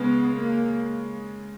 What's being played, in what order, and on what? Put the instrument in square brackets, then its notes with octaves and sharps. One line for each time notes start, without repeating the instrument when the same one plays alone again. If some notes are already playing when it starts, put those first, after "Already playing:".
Already playing: [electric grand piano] C#3 G#3 [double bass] B3
[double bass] A#3